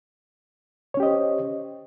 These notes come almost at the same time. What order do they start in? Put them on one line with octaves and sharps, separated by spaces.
C#5 C#4 G4 D#5 C5